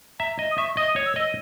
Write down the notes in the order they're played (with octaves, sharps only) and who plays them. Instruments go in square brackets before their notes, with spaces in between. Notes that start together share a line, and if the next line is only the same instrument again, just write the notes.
[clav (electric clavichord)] E5 [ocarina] A#5
[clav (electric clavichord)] D#5
[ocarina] D#6
[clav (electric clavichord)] E5 [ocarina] C#6
[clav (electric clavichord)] D#5 [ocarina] D#6
[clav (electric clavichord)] C#5
[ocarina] E6
[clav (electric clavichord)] D#5